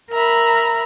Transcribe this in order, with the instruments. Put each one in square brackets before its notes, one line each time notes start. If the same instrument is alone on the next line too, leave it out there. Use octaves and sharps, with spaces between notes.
[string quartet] A#4 E5 A#5 B5